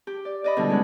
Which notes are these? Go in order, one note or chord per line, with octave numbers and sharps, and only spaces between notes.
G4
D5
D5 D#5 B5
B2 D3 G3 E4
G#3 C#4 F#5